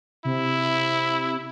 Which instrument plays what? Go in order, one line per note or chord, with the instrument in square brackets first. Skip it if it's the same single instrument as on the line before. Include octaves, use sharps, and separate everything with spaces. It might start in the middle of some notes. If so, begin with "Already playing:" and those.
[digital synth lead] C3 [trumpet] E4